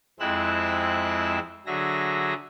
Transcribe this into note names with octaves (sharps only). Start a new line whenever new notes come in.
F2 G#3 C4 E4 E6 F#6
D3 F#3 G#4 E5 A#6